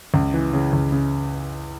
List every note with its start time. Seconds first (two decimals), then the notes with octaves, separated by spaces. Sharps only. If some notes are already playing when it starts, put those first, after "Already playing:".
0.14 C#2
0.34 E3
0.53 C#3
0.73 C#2
0.92 C#3